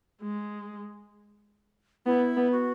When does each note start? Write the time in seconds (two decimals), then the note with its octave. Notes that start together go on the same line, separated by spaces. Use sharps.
0.22 G#3
2.06 B3 E4
2.36 B3
2.52 F#4